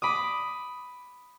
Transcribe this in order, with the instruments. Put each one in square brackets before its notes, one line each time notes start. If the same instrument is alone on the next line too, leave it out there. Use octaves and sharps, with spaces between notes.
[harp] B5 D6 D#6